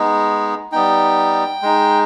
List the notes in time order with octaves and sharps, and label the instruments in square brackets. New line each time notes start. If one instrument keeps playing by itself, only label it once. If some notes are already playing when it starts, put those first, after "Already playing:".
Already playing: [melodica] G#3 B3 D#4
G3 B3 D#4 G5
G#3 D#4